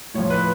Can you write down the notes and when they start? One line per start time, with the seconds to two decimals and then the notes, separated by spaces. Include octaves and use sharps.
0.14 A2 C#5
0.18 F3
0.30 B4